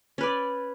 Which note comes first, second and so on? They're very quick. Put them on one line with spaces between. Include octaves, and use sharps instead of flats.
C#4 B4 D5